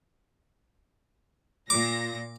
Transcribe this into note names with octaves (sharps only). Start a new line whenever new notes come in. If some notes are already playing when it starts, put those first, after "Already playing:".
A#2 D6 A#6